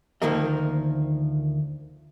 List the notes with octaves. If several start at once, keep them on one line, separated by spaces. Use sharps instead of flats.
D2 D#3 F3 A#3 A#4 D#5